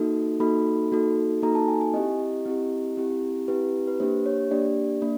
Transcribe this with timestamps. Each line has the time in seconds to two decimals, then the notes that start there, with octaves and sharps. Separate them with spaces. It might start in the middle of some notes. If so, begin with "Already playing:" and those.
Already playing: A#3 D#4 F#4 A4
0.40 A#3 D#4 F#4 A4 B5
0.92 A#3 D#4 F#4 A4
1.43 A#3 D#4 F#4 A4 A#5
1.55 A5
1.68 G#5
1.81 G#5
1.94 C4 E4 G4 D#5
2.45 C4 E4 G4
2.97 C4 E4 G4
3.48 C4 E4 G4 B4
3.88 B4
4.00 A#3 D4 G4 C5
4.26 C#5
4.51 A#3 D4 G4 D5
5.02 A#3 D4